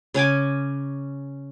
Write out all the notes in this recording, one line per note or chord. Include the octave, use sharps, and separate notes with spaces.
C#3 C#4 G#5 D6